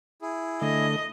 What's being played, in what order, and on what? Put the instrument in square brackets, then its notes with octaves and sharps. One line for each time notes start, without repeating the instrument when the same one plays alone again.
[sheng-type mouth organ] E4 G#4
[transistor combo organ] D3 A3 [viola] D#5